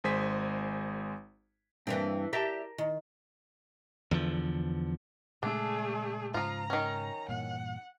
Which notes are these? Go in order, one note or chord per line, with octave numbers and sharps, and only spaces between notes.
G#1 G#3 G#4 C5 G#5 B6
G2 E3 A#3 C4 D4
G4 A#4 D5 E5 A5
D#3
E2 D3 F3
A#2 C#3 G#3 A3 D4 G#4
G#2 C#3 F3 F4 A#5
D#3 C#4
G2 A#2 E3 F#5